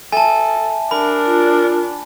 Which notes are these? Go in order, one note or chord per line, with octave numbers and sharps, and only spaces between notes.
A4 E5 G#5 A5
D4 A#4 B5
F4